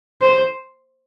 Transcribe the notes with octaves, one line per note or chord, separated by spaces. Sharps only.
C5